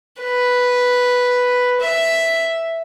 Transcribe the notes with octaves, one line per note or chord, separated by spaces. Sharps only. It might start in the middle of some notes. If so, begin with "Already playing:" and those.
B4
E5